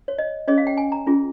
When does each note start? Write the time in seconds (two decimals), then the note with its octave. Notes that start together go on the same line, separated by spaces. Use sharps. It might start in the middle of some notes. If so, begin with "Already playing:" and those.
0.08 C#5
0.18 D#5
0.48 C#4 G#4 C#5 D#5
0.58 F5
0.67 G5
0.77 G#5
0.92 A#5
1.06 C#4 F4 G#4